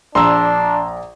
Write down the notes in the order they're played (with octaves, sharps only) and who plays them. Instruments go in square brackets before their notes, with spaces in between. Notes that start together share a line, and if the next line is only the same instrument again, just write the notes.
[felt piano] A#1 A#5 [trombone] D4 [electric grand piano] C6 E6